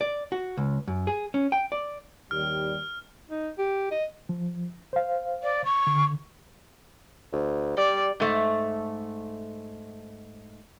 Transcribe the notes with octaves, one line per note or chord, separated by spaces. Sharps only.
D5
F#4
C#2
F#2
G#4
C#4
G5
D5
D#2 G3 F6
D#4
G4
D#5
F3
C5 F5
D5
C#6
D3
D2
G3 D5
G#2 A3